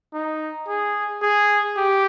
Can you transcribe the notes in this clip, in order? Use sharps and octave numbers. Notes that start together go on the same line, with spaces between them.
D#4
G#4
G#4
G4